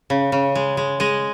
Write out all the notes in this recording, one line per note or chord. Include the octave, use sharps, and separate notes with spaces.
C#3
C#3
G#3
G#3
G#3 D#5